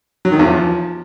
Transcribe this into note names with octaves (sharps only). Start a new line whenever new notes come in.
F#3
D#3
E2
F3